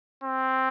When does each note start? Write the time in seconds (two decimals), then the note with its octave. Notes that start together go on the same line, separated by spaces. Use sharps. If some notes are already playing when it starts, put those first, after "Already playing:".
0.24 C4